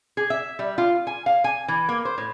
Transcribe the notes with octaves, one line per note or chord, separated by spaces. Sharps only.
G#4
E5
G3
F4
G#5
F5
G#5
E3
A#3
C5
A2